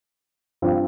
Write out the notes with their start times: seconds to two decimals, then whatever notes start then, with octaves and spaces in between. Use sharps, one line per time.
0.62 G2 F3 C4